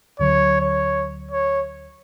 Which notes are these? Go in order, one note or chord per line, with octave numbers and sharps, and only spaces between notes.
D2 D3 F#3 C#5
C#5
C#5